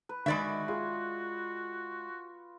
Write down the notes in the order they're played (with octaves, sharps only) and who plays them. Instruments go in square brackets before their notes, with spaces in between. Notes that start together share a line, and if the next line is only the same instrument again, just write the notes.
[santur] B4
[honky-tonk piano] D#3 B5 [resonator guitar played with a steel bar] G#3 D5 E5 [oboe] F#4
[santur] F4 [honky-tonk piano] G#4